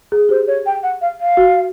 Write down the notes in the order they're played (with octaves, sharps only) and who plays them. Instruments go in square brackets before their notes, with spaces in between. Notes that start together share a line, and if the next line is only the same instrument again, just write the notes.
[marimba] G#4
[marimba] G4 [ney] C5
[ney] C#5
G5
F#5
F5
F5
[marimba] F#4